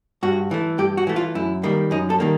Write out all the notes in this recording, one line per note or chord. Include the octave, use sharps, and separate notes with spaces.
G2 F#4
E3 A3
G2 G4
F#4
E3 A3
F4
F#2 E4
D#3 G3 A#3
F#2 D#4
A4
D#3 G3 A#3